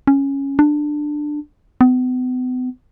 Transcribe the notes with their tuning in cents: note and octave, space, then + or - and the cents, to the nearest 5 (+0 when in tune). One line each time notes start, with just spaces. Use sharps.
C#4 -5
D4 +15
B3 +40